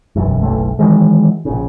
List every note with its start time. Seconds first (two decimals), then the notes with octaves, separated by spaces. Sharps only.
0.16 E1 B1 F#2
0.41 F#1 B1 A3
0.79 D#3 E3 F#3 G#3
1.45 A#1 C#3